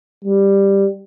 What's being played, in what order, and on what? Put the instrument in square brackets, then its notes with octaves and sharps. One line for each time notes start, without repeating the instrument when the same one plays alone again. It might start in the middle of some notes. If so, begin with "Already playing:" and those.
[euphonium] G3